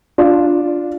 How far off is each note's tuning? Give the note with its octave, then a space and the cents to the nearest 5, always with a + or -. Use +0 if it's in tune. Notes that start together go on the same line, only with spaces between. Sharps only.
D4 +0 F4 +0